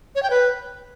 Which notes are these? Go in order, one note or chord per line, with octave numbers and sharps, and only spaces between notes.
C#5
G5
B4